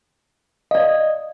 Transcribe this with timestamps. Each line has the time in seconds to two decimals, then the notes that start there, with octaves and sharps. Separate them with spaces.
0.71 D5 D#5 F5